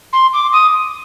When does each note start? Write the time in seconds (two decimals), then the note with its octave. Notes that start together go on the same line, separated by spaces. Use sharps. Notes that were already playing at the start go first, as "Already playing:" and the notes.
0.13 C6
0.33 D6
0.53 D#6